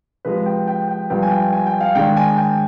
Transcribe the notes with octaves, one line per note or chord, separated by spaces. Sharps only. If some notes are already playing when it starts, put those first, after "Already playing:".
C3 F3 G#3 B4
G5
G5
G5
G2 F3 B3 G5
G#5
G5
G#5
G5
F5
G#2 D#3 G#3 D4 G5
G#5
G5